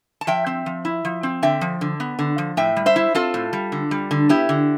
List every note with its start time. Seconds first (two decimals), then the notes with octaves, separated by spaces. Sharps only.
0.21 A5
0.27 F3 E5 G5
0.46 C4
0.66 F3
0.85 E4
1.05 F3
1.23 C4
1.43 D3 E5 G5
1.61 F3
1.81 D3
2.00 B3
2.19 D3
2.38 F3
2.57 A2 E5 G5
2.76 G3
2.86 C5 E5
2.96 E4
3.15 C4 F4 A4
3.34 A2
3.53 G3
3.72 D3
3.91 G3
4.11 D3
4.29 B3 E4 G4
4.49 D3